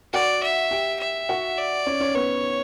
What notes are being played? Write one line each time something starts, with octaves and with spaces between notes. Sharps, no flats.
F#4 D5 F#5
E5
G4 G5
E5
F#4 F#5
D5
C#4 C#5
C#4 C#5
B3 B4 C#5